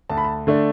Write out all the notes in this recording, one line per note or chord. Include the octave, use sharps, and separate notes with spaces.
D2 A5
B5
A5
D3 A3 D4